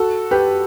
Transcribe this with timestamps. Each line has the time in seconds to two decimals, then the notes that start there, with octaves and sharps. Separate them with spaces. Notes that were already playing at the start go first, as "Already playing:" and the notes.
Already playing: F#4 A4
0.31 G4 B4